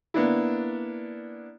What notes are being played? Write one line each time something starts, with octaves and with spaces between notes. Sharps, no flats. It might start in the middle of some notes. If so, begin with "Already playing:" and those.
A#3 B3 D4 E4